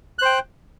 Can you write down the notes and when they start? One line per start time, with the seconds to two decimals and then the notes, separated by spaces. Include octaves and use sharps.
0.19 F#6
0.22 C5
0.25 G5